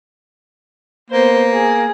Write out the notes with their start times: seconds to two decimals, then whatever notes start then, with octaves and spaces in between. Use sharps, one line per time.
1.10 A#3 B3 C5
1.53 G#4